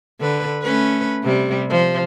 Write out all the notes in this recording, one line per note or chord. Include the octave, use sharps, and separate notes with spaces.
D3 B4
A3 C#4 B4
C3 G3
F3